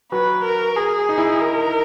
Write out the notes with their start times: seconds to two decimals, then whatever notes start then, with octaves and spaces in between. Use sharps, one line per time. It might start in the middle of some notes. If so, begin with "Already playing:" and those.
0.12 F#3 F#4 B4
0.44 A#4
0.76 G#4
1.09 D#4
1.18 E4
1.27 D#4
1.41 A#4